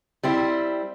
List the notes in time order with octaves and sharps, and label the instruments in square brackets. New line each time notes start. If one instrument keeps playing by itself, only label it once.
[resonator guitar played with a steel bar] G3 C4 E4